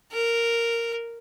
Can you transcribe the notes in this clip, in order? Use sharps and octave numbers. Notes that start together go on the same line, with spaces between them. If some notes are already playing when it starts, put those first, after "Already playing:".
A#4